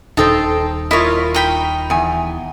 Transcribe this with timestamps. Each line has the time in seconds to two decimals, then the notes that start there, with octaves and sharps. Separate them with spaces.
0.17 D#1 D#4 A4 C5 G5 A5
0.91 E4 F4 A#4 C#5 D#5
1.34 D#4 G5 B5
1.90 E2 G#5